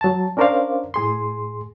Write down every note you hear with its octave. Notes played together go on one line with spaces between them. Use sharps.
F#3 A5
C#4 D4 A#4 C5 D5 F5
A2 G#4 C6